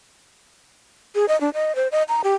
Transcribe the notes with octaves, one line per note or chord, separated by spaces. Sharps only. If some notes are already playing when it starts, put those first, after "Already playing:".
G#4
D#5
D4
D#5
C5
D#5
A#5
G4